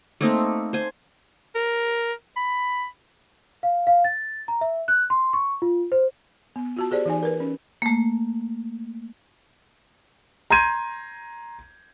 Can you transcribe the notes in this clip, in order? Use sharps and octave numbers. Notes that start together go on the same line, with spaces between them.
A3 A#3 C4 D#4
C5 G#5
A#4
B5
F5
F5
A6
A#5
E5
F#6
C6
C#6
F4
C5
B3
F4 F#4 A5
G4 G#4 C5 D5
E3 D#4 G#5
A#4 B4
C#4
A3 A#3
A#5 C6 G6 G#6 D#7